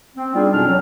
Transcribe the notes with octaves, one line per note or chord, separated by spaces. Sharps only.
C4
G3 B3 D4 D#4 F4 G#4
F2 B2 F#3 C#4 D4 F6
F#3